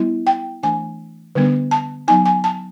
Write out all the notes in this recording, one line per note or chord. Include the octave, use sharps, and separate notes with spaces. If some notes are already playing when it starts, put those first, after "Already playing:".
Already playing: G3 B3 E4
G5
E3 A3 D4 G#5
D3 G3 B3 D4
A5
F#3 B3 D#4 G#5
G#5
A5